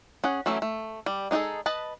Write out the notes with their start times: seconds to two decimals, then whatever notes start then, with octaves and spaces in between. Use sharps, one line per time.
0.24 C#4 G#4 F#5
0.46 E3 F#3 A3 C#4 E4
0.62 A3
1.06 G3
1.31 G#3 D#4 F#4 G#4 A4
1.66 B4 D#5 A5